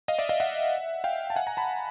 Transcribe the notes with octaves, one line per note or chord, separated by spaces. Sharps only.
D#5 F5
D5 E5
D#5 F5
E5 F#5
F5 G5
A5
F#5 G#5
G#5 A#5
A5 B5